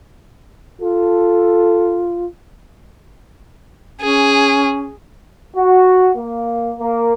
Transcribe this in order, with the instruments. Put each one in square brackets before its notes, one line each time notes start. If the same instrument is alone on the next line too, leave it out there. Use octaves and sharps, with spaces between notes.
[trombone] F4 [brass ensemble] A4
[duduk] C#4 [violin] G#4
[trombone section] F#4
A#3
A#3